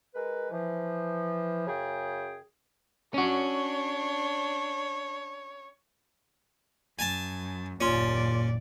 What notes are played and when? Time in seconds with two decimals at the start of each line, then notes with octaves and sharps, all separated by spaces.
0.15 G#3 A#4 B4
0.51 E3 F3
1.67 F#2 C#3 G#4 G5
3.14 C#4 D4 F#4 C#5
6.99 F#2 G#5 A5
7.81 F#1 D#2 A#2 C#4 F4 D5 C6